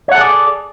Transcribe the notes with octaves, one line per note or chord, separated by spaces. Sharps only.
G#4 A4 C#5 D5 F#5